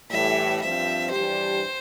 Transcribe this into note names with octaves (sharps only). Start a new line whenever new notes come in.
A2 E3 G3 E5
G2 F3 C4 F4 E5
G2 E3 G3 D4 G4 C5